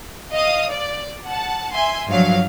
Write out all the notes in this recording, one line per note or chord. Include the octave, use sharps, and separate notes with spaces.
D#5 F5 D#6
D5
F#5 A5
E5 G#5 C6
G2 F3 F#3 F5